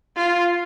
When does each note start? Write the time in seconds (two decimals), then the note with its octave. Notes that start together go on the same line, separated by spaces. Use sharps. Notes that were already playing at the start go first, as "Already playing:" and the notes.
0.16 F4